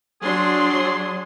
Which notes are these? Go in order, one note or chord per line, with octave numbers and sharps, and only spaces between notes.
F#3 D4 G#4 C6